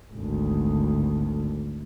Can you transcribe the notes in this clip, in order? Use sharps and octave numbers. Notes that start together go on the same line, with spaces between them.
G#1 D2